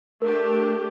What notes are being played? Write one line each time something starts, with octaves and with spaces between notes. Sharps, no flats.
A3 D4 G4 A#4